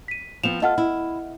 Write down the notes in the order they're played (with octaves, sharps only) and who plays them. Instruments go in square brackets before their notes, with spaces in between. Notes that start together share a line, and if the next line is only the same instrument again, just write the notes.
[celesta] B6 D#7
[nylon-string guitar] F3 B3 C4 [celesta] E7 F7
[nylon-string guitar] F4 A4 [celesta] D#5 F#5 F6
[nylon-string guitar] E4